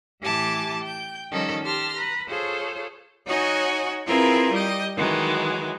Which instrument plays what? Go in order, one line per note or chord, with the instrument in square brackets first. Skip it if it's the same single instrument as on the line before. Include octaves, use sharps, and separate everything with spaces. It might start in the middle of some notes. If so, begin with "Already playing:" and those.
[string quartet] A2 E3 G4 G#5 A5 D6
G5 G6
D#3 F3 G3 C#4 D#4 A4
G4 A5 C6 F6 A#6
B4 A#5
F4 G#4 A4 C5 C#5
D#4 F#4 C#5 D#5 F#5 G#5
C4 E4 F4 G#4 A#4 B4
G3 G4 D#5
D#3 E3 F#3 G#3